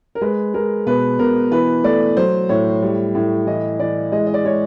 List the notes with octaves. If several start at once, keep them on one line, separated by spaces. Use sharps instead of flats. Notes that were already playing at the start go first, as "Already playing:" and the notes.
A#4
G#3 B4
G#3 A#4
B2 B4
B2 A#4
E3 B4
A3 D5
F#3 C5
A2 C#5
G3
A2
E3 D#5
E3 D5
G#3 D#5
D#5
D5
G#3 C#5